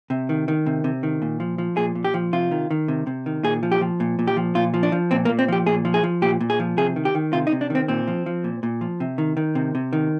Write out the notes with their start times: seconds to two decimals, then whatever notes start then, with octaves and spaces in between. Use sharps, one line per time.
0.10 C3
0.29 D#3
0.48 D#3
0.66 C3
0.84 C3
1.03 D#3
1.22 A#2
1.40 F3
1.58 F3
1.77 A#2 G#4
1.95 A#2
2.04 G4
2.14 F3
2.33 C3 F4
2.51 D#3
2.71 D#3
2.88 C3
3.07 C3
3.26 D#3
3.44 A#2 G#4
3.63 F3
3.72 G4
3.81 F3
4.00 A#2
4.19 A#2
4.27 G4
4.37 F3
4.55 A#2 F4
4.74 F3
4.83 D4
4.92 F3
5.11 A#2 C4
5.25 A#3
5.29 A#2
5.39 C4
5.48 F3 G4
5.66 A#2 G#4
5.85 F3
5.94 G#4
6.03 F3
6.22 A#2 G4
6.41 A#2
6.50 G#4
6.60 F3
6.77 C3 G#4
6.96 D#3
7.05 G4
7.15 D#3
7.33 C3 F4
7.47 D#4
7.52 C3
7.61 D4
7.70 D#3 C4
7.88 A#2 C4
8.08 F3
8.26 F3
8.44 A#2
8.63 A#2
8.81 F3
9.00 C3
9.18 D#3
9.37 D#3
9.55 C3
9.75 C3
9.93 D#3